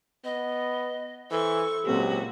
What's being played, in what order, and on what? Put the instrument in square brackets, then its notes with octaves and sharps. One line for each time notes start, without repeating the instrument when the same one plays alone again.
[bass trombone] B3 [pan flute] D#5
[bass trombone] E3 [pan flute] A4 [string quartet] C5 C#6
[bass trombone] C#2 [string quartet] A#2 F#4 [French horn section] F#3 C4 G4